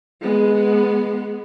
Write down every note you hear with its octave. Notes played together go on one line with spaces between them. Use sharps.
G#3 B3